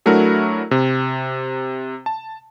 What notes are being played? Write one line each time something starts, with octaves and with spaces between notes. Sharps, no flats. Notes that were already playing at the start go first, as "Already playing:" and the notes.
F#3 A3 D4 E4 F#4 A#4
C3
A5